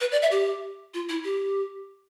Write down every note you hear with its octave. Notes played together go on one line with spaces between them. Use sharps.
B4
D5
E5
G4
F4
E4
G4